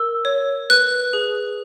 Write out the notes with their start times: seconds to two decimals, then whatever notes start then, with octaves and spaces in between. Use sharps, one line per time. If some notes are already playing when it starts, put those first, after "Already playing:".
Already playing: A#4 E6
0.25 C#5
0.70 B4 F#6
1.13 G#4